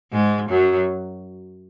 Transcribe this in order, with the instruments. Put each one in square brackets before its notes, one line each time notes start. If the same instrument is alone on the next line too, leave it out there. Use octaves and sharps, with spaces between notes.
[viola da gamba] G#2 G#3
F#2 F#3